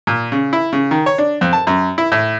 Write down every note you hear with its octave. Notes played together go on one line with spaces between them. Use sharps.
A#2
C#3
E4
C#3
D#3
C#5
D4
F2
A5
F#2
E4
A2